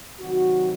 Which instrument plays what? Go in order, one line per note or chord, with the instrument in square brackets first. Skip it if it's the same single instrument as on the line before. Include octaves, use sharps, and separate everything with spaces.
[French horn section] C3 D#3 F#3 F#4